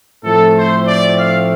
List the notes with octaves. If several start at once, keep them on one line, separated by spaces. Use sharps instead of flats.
A2 F3 A3 C4 A4
C5
D5
F5